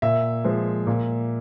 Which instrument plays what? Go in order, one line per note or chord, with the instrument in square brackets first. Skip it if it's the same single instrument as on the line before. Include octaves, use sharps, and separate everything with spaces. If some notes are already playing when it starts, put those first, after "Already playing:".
[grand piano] A#2 E5
F3 G#3
A#2